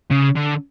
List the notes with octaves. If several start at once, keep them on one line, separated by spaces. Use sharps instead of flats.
C#3
D3